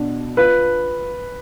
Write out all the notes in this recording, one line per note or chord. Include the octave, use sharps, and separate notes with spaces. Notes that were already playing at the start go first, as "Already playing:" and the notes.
Already playing: B2 D4
F4 B4